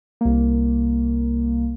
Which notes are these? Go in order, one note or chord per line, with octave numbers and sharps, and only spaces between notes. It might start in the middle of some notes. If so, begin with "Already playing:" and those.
C2 A#3